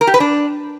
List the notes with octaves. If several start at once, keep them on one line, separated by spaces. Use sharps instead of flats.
A#4
G4
B4
D4